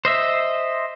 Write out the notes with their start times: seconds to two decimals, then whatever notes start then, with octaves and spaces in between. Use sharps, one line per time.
0.05 C5 D#5 E5